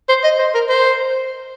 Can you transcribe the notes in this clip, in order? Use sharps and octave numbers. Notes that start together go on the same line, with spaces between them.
C5
D#5
C5
A#4
C5